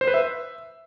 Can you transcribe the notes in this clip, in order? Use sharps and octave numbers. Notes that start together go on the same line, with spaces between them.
C5
B4
E5